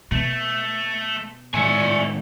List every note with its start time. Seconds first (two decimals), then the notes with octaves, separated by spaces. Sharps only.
0.12 B2 A3
1.54 A2 D#3 G#3 C#5 D5 E5 G#5